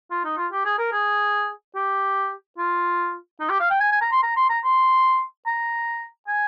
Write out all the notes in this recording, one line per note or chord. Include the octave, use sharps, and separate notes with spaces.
F4
D#4
F4
G4
G#4
A#4
G#4
G4
F4
D#4
G4
F5
G5
G#5
G#5
A#5
C6
A#5
C6
A#5
C6
A#5
G#5